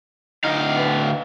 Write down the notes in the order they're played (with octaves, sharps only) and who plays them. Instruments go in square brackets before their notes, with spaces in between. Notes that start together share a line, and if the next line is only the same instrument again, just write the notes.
[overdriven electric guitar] D2 F5 [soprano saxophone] D#4
[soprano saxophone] B3